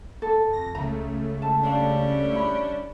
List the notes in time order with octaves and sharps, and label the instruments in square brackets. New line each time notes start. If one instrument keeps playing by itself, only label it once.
[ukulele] A4
[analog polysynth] F2 A#6
[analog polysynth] C#2 C#3 A3 [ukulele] A#5
[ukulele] A5
[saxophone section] G3 C#4 D4 [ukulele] F5 A5
[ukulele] E4 B5